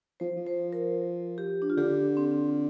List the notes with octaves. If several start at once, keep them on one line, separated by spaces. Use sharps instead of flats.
F3 C5
F3
C5
A#4
G4
D4
F4
D3 G4
C4